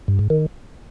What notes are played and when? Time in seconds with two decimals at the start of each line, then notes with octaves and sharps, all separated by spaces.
0.08 G2
0.19 G#2
0.30 D#3